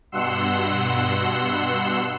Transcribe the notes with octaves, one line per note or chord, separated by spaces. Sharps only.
G2 B2 F#5 C6 E6